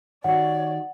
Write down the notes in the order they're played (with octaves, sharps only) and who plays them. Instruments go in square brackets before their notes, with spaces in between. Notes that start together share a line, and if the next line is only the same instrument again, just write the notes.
[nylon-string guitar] D#3 F#4 G4 [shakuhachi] C#5 [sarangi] D5 [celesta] F#5